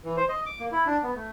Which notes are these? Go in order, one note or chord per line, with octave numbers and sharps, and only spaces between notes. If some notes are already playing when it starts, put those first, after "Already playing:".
E3
C5
D#5
D6
A#3
E4
D4
B3
A3